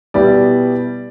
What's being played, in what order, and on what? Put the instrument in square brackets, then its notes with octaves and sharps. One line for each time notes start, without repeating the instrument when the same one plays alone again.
[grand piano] B2 G3 B3 E4 D5